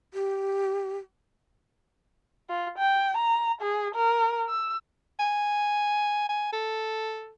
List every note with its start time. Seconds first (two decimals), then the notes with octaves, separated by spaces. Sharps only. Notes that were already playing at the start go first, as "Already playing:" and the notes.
0.14 G4
2.49 F4
2.78 G5
3.17 A#5
3.62 G#4
3.95 A#4
4.49 E6
5.19 G#5
6.29 G#5
6.53 A4